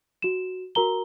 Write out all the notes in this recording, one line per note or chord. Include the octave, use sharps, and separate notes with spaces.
F#4 E7
F#4 A#4 A#5 G7